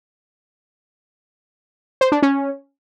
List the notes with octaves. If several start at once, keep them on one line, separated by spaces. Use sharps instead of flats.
C5
D4
C#4